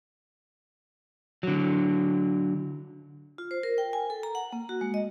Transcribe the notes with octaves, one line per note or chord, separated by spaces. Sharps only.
D3 F#3
F4
C5
A#4
G5
G#5
A4
A#5
F#5
A#3
F#4
G#3
D#5